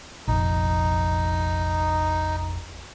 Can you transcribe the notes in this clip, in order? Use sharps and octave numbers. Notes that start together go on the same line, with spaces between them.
F1 A#1 D#4